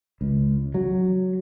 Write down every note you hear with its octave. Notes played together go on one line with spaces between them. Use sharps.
C#2
F#3